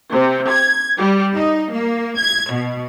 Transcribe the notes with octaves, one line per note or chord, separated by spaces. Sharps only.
C3
G#6
G3
D#4
A#3
G#6
B2